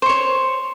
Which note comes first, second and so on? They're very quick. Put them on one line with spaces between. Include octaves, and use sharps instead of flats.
C5 C#6 C#5